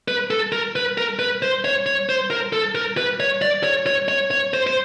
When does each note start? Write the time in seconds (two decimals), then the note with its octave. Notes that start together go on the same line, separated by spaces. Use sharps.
0.08 B4
0.31 A4
0.52 A#4
0.76 B4
0.98 A#4
1.19 B4
1.42 C5
1.64 C#5
1.86 C#5
2.09 C5
2.30 A#4
2.53 A4
2.75 A#4
2.97 B4
3.20 C#5
3.42 D5
3.64 C#5
3.87 C#5
4.08 C#5
4.31 C#5
4.54 C5
4.67 C5